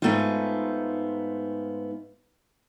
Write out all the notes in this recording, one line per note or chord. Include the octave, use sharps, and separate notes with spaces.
G#2 F#3 A3 B3 D#4 F4